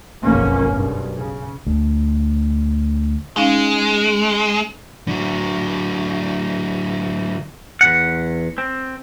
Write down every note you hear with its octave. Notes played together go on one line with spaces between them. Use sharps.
F#1 B1 F2 A#3 C#4
B1 G2
C#3
D2
G#3 C#4 D#4 F5
D3 F#3
E2 C#3 F#5
C4